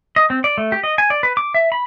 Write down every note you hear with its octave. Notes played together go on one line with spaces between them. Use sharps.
D#5
C4
D5
A3
G4
D#5
G#5
D5
B4
D6
E5
B5